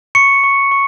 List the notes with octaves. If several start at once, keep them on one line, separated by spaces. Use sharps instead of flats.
C#6 C#7
C#6
C#6